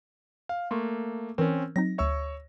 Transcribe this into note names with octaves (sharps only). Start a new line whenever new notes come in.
F5
A3 A#3 C6 C#6
E3 C4 C#4 A#4 C#6
F#3 C4 D#4 A#6
D2 C#5 E5 C#6 E6